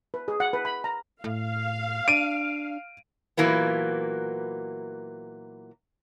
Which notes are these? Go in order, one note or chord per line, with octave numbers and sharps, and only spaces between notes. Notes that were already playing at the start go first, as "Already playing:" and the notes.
B4
G#4
F#5
B4
B5
A#5
A2 F5
D4 D7 D#7
A#2 E3 F#3 A#3 B3